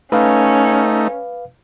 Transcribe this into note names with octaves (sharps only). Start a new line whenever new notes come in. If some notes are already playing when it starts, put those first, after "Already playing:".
A3 C#4 D#4 B4 F5